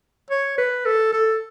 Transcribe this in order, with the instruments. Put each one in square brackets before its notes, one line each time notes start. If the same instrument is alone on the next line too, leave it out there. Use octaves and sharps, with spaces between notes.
[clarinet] C#5
B4
A4
A4